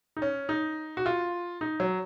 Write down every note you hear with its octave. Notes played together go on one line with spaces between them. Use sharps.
D#4
C#4
D#4
F#4
F4
D#4
F#3